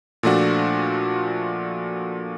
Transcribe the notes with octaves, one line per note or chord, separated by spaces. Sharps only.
A#2 F3 A3 D4 F#4